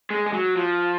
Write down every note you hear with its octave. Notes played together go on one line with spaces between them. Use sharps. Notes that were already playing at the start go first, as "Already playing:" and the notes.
G#3
G#3
F#3
F3